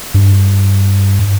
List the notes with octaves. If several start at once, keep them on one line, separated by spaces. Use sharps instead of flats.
G2